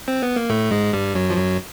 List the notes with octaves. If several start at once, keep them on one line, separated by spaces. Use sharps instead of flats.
C4
B3
A#3
A2 A3
G#2 G#3
G2 G3
F#2 F#3
F3
F#2 F#3